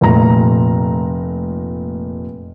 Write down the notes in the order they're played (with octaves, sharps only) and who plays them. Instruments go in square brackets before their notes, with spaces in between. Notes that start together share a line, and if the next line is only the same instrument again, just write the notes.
[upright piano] F1 A#2 A3 A#5